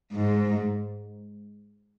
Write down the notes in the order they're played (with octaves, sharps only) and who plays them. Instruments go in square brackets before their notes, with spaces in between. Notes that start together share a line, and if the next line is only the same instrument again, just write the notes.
[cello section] G#2